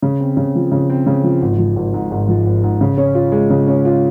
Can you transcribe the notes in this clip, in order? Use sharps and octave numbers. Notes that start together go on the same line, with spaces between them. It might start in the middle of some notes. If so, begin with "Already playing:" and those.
C#3
C4
C#3
F3
C#3
C4
C#3
F3
G#1
F3
G#1
G#2
G#1
F3
G#1
G#2
C#3
C#4
F4
G#3
C#3
C#4
F4